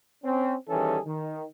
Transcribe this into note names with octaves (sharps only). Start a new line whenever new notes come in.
C4 C#4
D#3 E3 G3 C#4 G#4 A4
D#3